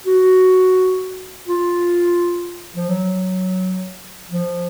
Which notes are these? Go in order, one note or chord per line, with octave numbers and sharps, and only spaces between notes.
F#4
F4
F3
F#3
F3